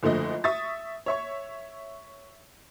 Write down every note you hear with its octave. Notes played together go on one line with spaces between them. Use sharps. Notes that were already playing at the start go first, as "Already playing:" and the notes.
F#1 D3 F3 A3 D#5
E5 C#6 D#6 A6
C#5 E5 C#6